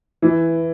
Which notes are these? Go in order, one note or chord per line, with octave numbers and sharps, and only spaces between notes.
E3